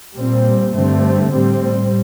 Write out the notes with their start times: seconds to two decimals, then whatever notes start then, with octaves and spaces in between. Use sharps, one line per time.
0.17 A#2 G3 C4
0.74 G2 D3 A3 C4
1.33 A2 G3 C4